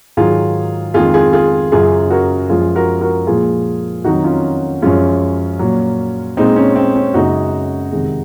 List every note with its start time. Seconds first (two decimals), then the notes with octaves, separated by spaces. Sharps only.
0.17 G#2 D#3 F#3 F4 G#4
0.94 F2 D#3 G#3 F4 G#4
1.14 F4 G#4
1.33 F4 G#4
1.72 F#2 C#3 F#3 F4 G#4
2.10 F#4 A#4
2.49 F#2 F3 G#3 F4 G#4
2.75 F#4 A#4
3.01 F#4 A#4
3.27 A#2 F3 G#3 F4 G#4
4.04 F2 D#3 F#3 D#4 F#4
4.24 C#4 F4
4.82 F#2 F3 G#3 C#4 F4
5.59 A#2 F#3
6.37 A#2 G#3 C4 D#4
6.56 C#4
6.76 C4
6.95 C#4
7.14 F#2 C#3 G#3 D#4 F#4
7.92 F2 C3 D#3 G#3